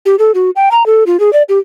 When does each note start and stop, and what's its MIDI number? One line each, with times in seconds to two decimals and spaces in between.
0.06 0.16 67
0.19 0.32 69
0.35 0.50 66
0.56 0.69 79
0.71 0.85 82
0.86 1.04 69
1.07 1.19 65
1.20 1.32 68
1.33 1.43 74
1.49 1.59 67